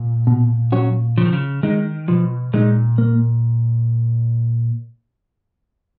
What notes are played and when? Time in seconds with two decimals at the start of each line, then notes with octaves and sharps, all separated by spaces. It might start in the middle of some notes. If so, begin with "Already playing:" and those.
Already playing: A#2
0.27 B2
0.72 F#3 C#4 F#4 C#5
1.17 C#3 F3
1.25 D#3
1.33 C#3
1.63 D#3 G#3 D#4
2.08 B2 F3
2.53 A#2 G#3 D#4
2.98 A#3